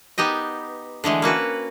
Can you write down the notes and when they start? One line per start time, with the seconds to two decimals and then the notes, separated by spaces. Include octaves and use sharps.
0.18 B3 D#4 G4 D#5
1.04 D3 E3 G#3 A3
1.22 A#3 C#4 F#4 B4